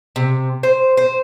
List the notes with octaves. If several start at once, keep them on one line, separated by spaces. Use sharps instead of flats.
C3
C5
C5